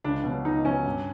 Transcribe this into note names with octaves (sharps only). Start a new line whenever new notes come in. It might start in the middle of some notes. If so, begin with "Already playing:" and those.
C#2 D4
B2
F#3
C#2 D#4
B2 F#3 C#4
G2